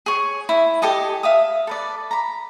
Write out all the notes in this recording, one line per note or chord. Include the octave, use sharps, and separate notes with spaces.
G#4 C#5
E4
G4 A4 D#5 G#5
E5 F5 D#6
A4 B4 D5
A#5 B5